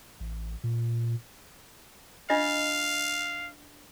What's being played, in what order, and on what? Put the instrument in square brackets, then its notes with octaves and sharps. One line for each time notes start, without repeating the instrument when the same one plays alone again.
[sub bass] A1
A#2
[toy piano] D4 F4 D#5 [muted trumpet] F5